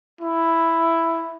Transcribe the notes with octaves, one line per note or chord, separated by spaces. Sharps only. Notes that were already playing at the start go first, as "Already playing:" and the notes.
E4